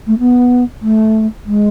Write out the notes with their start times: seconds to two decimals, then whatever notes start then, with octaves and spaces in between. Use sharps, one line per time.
0.07 A3
0.19 B3
0.82 A3
1.46 G#3